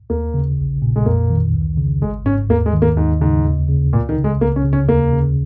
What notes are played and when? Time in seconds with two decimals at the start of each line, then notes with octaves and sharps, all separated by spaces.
0.10 D#2 A#3
0.34 C#3
0.58 A#1
0.82 A#2
0.96 G#3
1.06 F2 A#3
1.30 D#3
1.54 C#2
1.78 C#3
2.02 G#1 G#3
2.25 G#2 C#4
2.49 D#2 A#3
2.66 G#3
2.74 D#3
2.82 A#3
2.97 D#2 G#2
3.21 G#2 C#3
3.44 D#2
3.69 C#3
3.93 C#2 A#2
4.09 D#3
4.17 C#3
4.24 G#3
4.40 C#2 A#3
4.56 C#4
4.64 C#3
4.73 C#4
4.88 D#2 A#3
5.12 C#3